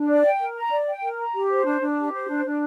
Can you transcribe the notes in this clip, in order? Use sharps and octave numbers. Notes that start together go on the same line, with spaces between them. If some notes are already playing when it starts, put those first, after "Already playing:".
Already playing: D4
D5
G5
A#4
A#5
D5
G5
A#4
A#5
G4
C5
D4
D4
G4
C5
D4
D4